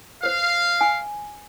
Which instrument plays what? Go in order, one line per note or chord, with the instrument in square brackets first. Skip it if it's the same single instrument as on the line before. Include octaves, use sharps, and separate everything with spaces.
[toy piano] B4 C5 [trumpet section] F5
[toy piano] G#5